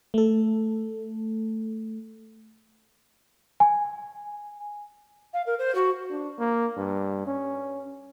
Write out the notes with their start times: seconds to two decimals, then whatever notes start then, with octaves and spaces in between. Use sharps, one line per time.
0.14 A3 A4
3.60 G#5
5.33 F5
5.46 A#4
5.58 C5
5.74 F#4
6.10 D4
6.39 A#3
6.77 G2
7.27 C#4